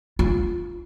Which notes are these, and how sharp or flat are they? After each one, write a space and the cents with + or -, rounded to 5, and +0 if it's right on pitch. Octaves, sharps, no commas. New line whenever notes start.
F4 +5